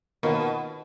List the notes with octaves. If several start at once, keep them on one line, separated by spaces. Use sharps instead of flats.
B2 D#3 A#3 F4 A#4 C#5